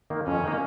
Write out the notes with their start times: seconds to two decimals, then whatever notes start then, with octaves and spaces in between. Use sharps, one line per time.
0.10 D#3 A#3
0.27 F2 C#4
0.44 D#3 A#3